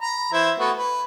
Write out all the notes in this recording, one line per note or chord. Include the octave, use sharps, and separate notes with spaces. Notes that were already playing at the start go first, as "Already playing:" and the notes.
A#5 B5
E3 E4 C5
A3 B3 F#4
B4